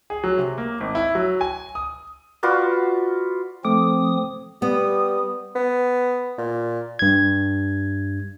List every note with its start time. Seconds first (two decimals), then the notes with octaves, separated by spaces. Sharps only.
0.10 G#4
0.24 F#3
0.38 C3
0.58 A#3
0.80 G#1
0.95 E4
1.15 F#3
1.41 G#5
1.75 D#6
2.43 F4 F#4 B4 D5
3.65 F3 A3 C4 D6 D#6
4.62 G3 B3 D#6
5.56 B3
6.38 A#2
6.99 G2 G#6